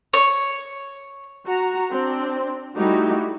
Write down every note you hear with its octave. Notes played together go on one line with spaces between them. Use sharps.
C#5
F#4 A#5
C4 D4
G3 A3 D#4 E4 F#4 G4